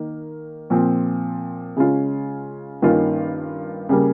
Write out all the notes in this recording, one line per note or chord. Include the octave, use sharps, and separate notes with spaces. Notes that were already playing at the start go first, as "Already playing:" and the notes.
Already playing: D#3 A#3
A#2 F3 C4
C#3 G#3 C#4 F4
G2 D#3 A#3 C#4 F4
C#3 G3 A#3